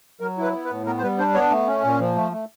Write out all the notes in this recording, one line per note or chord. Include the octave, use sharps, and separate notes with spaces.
F#3 A#4
E4 B4
B3
B4
A2
B3 A#4
C5
G3 B4
D4 C5
B3 C#5
A3
C#4
A#2
F3
A3
A3